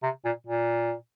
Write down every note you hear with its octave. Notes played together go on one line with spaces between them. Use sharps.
C3
A#2
A#2